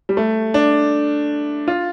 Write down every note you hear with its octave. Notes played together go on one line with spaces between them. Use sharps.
G3
A3
D4
F4